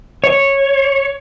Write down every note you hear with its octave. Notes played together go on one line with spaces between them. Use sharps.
C#5